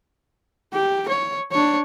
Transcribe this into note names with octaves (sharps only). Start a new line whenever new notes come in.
G4
C#5
D4 C#5